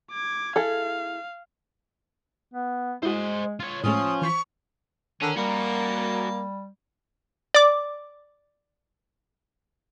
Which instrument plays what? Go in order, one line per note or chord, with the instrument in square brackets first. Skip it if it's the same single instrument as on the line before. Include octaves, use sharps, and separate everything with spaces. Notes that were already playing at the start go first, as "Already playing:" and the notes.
[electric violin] D6 G#6
[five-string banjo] E4 G#4 A4 [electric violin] F5
[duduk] B3
[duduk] G#3 [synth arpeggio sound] E4 F#4 [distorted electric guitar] C5 D#5
[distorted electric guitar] F4 C#5
[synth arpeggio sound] A2 G#3 A3 [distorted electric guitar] F3 F4 [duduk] C#4 [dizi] D#6
[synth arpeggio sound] E3 C5 B6 [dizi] C#6
[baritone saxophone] D3 [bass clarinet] D#3 [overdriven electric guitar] C#4
[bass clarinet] G3 [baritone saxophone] A#3 [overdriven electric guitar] F#4 A#4
[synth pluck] D5 D6